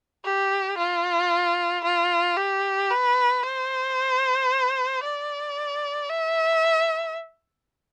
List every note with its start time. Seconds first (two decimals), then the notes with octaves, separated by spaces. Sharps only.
0.25 G4
0.78 F4
1.84 F4
2.37 G4
2.91 B4
3.43 C5
5.04 D5
6.10 E5